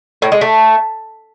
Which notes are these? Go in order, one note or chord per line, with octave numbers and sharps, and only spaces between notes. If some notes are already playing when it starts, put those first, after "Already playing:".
A2
G#3
A3